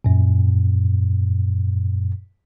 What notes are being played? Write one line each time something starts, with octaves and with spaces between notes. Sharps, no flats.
F#2 A#2